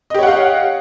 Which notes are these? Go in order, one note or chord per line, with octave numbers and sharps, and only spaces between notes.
G4 C#5 D#5 F5 F#5